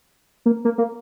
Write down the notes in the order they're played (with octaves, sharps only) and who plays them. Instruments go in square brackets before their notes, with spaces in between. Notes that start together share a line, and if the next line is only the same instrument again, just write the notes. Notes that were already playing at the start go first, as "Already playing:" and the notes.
[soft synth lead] A#3
A#3
A#3